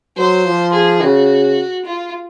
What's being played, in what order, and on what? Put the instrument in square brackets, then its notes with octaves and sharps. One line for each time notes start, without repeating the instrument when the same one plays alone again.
[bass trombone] F#3 [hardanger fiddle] C5
[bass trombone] F3
[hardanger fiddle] G#4
[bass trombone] C#3 [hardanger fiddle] F#4
[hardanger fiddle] F4